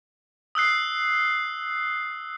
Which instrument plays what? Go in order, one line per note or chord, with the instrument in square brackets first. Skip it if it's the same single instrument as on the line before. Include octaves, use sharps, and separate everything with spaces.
[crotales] D#6 E6 F#6 C7